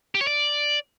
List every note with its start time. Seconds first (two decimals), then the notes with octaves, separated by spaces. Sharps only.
0.15 G4
0.21 C#5
0.27 D5